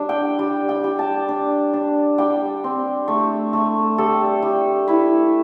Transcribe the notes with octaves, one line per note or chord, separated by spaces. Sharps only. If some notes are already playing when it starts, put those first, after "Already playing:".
Already playing: G3 D4
G5
G3
G5
G3
A5
D4
D4
G3 G5
C4
A3
A3
G3 A4
G3
E4 B4